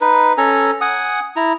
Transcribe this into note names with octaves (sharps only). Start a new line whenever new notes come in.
D#4 B4
C#4 A4 G#5 A#5
F#5 G#5 D#6
E4 A#5